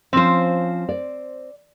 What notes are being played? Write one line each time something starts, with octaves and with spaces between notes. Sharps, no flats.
F3 C4 C#4 C5
D5